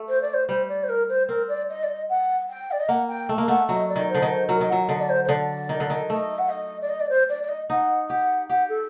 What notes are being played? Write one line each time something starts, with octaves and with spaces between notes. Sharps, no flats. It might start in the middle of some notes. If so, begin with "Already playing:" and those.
Already playing: A3
C5
D5
C5
G3 C5
D5
C5
A#4
C5
C4 A#4
D5
D#5
D5
D#5
F#5
G5
D5
D#5
A#3 F#5
G5
A3
A#3
A3 F#5
F#3 D#5
D5
D#3
C5
D3
D#3
C5
F#3 A#4
D#3
F#3 F#5
D3 D#5
D5
C5
C5
D3 D5
D#3
D3
D#3
A3 D#5
F#5
D#5
D5
D#5
D5
C5
D5
D5
D#5
D#4 F#5
G4 F#5
G4 F#5
A4